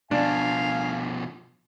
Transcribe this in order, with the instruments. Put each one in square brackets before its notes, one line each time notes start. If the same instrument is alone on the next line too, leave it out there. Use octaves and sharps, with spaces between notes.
[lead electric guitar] B2 F3 [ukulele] D4 [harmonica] F5 G#5